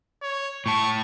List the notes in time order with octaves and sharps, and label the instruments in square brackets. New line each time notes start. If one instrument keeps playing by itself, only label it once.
[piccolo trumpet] C#5
[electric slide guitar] A2 A5 [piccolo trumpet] C#6